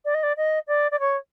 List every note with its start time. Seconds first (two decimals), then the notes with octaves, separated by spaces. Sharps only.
0.05 D5
0.14 D#5
0.23 D5
0.37 D#5
0.67 D5
0.91 D5
1.00 C#5